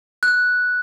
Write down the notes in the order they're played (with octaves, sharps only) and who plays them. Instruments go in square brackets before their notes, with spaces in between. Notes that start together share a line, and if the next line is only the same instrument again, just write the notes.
[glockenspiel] F#6